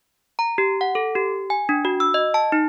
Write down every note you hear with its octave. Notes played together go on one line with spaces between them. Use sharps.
A#5
G4
F#5
A4
G4
G#5
D4
F#4
E6
D#5
A5
D#4